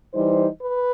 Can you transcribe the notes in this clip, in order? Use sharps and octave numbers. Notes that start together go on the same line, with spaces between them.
E3 G3 D#4 C5
B4